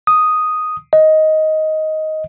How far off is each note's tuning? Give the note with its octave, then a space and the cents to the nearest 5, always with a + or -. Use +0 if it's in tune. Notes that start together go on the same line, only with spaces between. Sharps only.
D#6 +0
D#5 +10